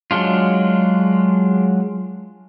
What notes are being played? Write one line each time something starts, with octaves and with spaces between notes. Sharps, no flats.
F#3 G#3 D4 F4